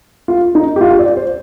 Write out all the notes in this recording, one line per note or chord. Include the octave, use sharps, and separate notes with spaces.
F4
D#4
G4
F4
D5
C5